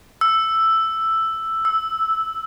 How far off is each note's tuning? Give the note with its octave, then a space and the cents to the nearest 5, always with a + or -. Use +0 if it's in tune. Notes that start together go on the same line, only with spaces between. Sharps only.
E6 +5
E6 -10